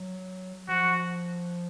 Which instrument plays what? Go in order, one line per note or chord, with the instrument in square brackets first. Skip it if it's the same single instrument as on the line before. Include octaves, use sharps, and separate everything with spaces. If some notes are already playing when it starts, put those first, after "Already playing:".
Already playing: [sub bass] F#3
[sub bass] F3 [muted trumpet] F#4